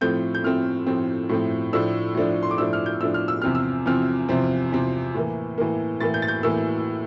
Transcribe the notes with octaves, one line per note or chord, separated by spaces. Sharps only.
A2 F3 A3 C4 G6
G6
A2 F3 A3 C4 F6
A2 F3 A3 C4
A2 F3 A3 C4
A2 F3 A3 D4 E6
A2 F3 A3 D4
C6
D6
A2 F3 A3 D4 E6
F6
G6
A2 F3 A3 D4 E6
F6
E6
E2 C3 F3 C4 F6
E6
E2 C3 F3 C4 F6
E2 C3 F3 C4
E2 C3 F3 C4
A2 E3 A#3
A2 E3 A#3
A2 E3 A#3 A6
G6
A6
G6
A2 E3 A#3 E6